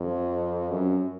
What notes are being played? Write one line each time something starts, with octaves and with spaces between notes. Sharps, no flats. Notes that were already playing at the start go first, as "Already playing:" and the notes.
Already playing: F2
F#2